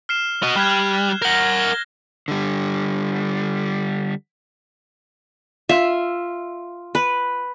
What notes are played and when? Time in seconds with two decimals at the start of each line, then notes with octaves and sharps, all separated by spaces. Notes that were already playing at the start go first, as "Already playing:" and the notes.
0.09 F6 C7 E7
0.43 F#4 D#5
0.56 G3 F6 F#6 G#6
1.22 A#4 F#5 G6 A#6 G7
2.28 D3 G3
5.69 F4 E5
6.95 B4